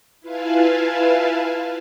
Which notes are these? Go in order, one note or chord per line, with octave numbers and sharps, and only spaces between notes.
E4 F4 B4 F5 G#5 A5